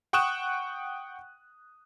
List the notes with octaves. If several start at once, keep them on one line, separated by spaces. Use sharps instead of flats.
F#5 G5 C#6 D#6 F#6 E7